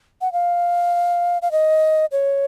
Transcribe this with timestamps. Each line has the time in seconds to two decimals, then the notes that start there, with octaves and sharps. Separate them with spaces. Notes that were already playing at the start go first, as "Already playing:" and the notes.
0.21 F#5
0.33 F5
1.42 F5
1.52 D#5
2.12 C#5